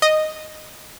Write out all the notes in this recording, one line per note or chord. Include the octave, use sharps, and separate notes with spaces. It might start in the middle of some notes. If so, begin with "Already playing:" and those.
D#5